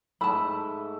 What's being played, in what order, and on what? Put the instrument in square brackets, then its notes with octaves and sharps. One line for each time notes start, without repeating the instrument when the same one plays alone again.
[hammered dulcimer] G#2 A3 E5 [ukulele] A5 B5